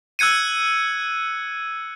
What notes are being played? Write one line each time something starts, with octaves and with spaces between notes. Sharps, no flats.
E6 F#6 G#6 C#7 D#7